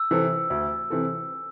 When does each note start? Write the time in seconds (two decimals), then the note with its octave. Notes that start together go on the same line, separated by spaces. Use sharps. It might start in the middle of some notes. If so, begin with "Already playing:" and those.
Already playing: E6
0.11 C3 E3 C4 A4
0.50 D2
0.90 C3 E3 C4 A4